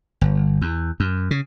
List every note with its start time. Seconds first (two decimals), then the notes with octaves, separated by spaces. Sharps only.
0.21 G1
0.61 E2
1.00 F#2
1.31 C#3